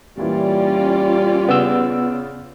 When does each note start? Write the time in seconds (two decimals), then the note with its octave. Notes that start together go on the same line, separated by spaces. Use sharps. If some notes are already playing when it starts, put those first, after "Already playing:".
0.17 A#2 E3 G3 C#4 F4 D5
1.49 C#3 B3 E6